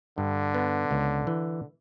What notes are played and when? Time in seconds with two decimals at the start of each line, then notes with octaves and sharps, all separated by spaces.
0.18 G2 D3
0.54 B3
0.91 C#2
1.27 E3